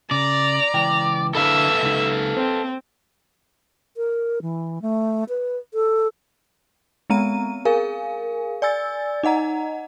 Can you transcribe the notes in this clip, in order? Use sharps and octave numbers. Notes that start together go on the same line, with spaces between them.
C#3 D5 A#5
C#2 E3 G5
D3 E4 A4 B4 E5 F5
C#2 D#4
C4 C5
A#4
E3
A3
B4
A4
G#3 B3 C4 A#5 D#7
G#4 A#4 F5 G#5
D5 G#5 E6 A6
D#4 D#5 F#5 A#5